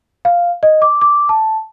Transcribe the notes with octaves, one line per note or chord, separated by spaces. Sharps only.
F5
D#5
D6
D6
A5